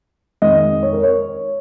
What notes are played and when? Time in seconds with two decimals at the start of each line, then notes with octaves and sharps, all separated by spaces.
0.42 F2 D#3 G#3 D#5
0.83 C#5
0.93 A#4
1.03 C#5